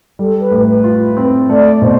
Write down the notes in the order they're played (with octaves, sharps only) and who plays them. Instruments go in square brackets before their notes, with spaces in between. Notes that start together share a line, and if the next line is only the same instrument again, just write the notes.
[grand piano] G3 [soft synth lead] A4
[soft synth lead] B4
[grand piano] A2
[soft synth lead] B4
[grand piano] F4
C4
[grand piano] A3 [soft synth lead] D5
[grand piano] B2 [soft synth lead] C5